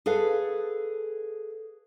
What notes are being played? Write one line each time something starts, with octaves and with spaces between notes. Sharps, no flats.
G#4 A4 B4 F5